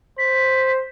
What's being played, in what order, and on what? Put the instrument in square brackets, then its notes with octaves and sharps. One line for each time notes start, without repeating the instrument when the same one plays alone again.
[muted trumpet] C5 [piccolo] B6